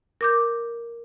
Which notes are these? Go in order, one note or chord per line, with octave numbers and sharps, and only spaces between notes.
A#4 D6 G6